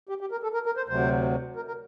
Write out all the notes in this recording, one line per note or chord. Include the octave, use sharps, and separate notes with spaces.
G4
G4
A#4
A4
A#4
A#4
C5
D2 C3 F#3 C5
A#4
A#4